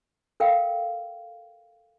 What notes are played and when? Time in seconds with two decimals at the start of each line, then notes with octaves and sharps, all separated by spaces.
0.40 A4 A#4 F5 G5